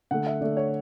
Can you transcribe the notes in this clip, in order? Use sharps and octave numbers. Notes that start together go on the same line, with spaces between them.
D3 A3 F#5
E5
D3 A3 D5
C#5